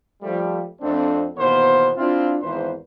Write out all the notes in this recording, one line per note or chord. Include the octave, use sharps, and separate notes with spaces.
F3 G3 A3
F2 A3 C4 D4
D#2 B2 E3 B3 A#4 C5
C4 D4 E4 F4
G#1 E2 B4 C5